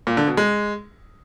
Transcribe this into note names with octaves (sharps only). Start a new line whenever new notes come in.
A#2
D3
B2
G#3